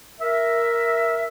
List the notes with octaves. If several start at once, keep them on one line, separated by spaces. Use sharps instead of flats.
A#4 E5